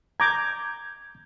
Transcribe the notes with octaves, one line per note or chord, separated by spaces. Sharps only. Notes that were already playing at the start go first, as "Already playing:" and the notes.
A#5 D6 G6 G#6